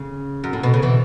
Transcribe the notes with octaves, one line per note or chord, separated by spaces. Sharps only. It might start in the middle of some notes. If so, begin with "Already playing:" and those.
Already playing: C#3
F#2
A2
B2
C#3
B2 E3